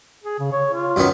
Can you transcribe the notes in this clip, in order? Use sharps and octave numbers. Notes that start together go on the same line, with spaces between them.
G#4
C#3
C#5
F4
F#2 D#3 B3